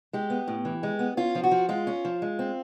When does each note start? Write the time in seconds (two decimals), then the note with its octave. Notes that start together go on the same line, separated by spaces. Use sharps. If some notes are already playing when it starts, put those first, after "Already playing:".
0.13 G#3 G4
0.30 B3
0.48 A2
0.65 E3
0.83 G#3
0.99 B3
1.17 C#4 F4
1.35 F3
1.44 F#4
1.51 F3
1.69 G#3 F4
1.87 C#4
2.05 F3
2.22 G#3
2.39 C4